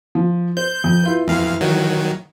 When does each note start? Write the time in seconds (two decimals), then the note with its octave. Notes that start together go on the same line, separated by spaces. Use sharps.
0.15 F3
0.57 C5 G6
0.84 F2
1.03 E4 F4 B4
1.28 F2 E3 F5
1.61 D#3 F#3